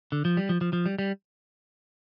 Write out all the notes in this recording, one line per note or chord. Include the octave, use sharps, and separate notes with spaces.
D3
F3
G3
F3
F3
F3
G3
G3